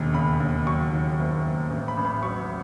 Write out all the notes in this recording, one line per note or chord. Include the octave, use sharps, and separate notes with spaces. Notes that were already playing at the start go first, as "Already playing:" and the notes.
Already playing: E1 D#2
C#3 B5
D#2
F#3 C#6
D#3
F#1
F#1
A1
B5
A1
B5
F#3 C#6